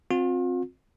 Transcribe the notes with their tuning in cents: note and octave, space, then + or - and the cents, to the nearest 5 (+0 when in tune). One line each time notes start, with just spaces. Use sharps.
C4 +10 F4 +40